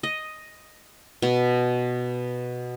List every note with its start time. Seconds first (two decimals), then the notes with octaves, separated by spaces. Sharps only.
0.03 D#5
1.22 B2